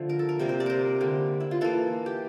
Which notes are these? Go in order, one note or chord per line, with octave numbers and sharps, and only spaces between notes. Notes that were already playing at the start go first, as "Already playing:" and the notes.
Already playing: D3 F3 A3
A#4
A4
A#4
C3 G3 A#3
C5
D5
A#4 C5
D3 G3 A#3
E4
F4
E3 A#3 A4
G4